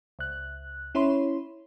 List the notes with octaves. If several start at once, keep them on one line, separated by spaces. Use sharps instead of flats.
C#2 F#6
C#4 E4 C#5 B5 C6